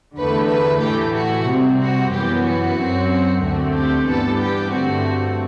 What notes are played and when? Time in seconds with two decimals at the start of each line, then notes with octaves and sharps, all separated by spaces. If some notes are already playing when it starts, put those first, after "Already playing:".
0.17 E2 D3 A3 B4
0.50 B4
0.82 A2 E3 A3 G4
1.15 F#4
1.47 C3 G3 C4
1.79 F#4
2.12 F#2 E3 B3 G4
2.45 F#4
2.77 F#2 F#3 C4
3.42 D2 D3 A3 C4 F#4
3.74 G4
4.07 G2 E3 G3 B3 A4
4.40 G4
4.73 G2 D3 A3 C4 F#4